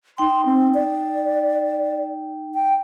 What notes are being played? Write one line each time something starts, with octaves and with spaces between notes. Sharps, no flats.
D#4 G5 C6
C4
D5
G5